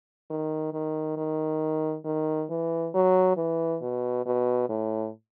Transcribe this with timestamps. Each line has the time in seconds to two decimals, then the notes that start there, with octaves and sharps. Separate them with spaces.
0.30 D#3
0.73 D#3
1.17 D#3
2.05 D#3
2.50 E3
2.94 F#3
3.37 E3
3.82 B2
4.26 B2
4.69 A2